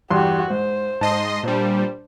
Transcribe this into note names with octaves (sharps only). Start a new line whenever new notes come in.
E2 G2 F#4 G4 C6
G#2 C5
G#2 D#5 A5 C6
A#2 G3 D4 C5